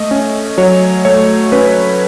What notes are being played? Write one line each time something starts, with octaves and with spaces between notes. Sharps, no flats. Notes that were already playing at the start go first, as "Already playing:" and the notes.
Already playing: A3 D#5
C#4
F#3 C#5
A3 C#5
C#4 B4